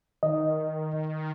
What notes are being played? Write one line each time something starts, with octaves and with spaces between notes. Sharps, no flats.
D#3 D#5